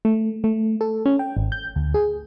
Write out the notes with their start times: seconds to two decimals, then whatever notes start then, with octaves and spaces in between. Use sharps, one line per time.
0.05 A3
0.44 A3
0.81 A4
1.06 C#4
1.19 G5
1.37 G#1
1.52 G6
1.76 D2
1.94 G#4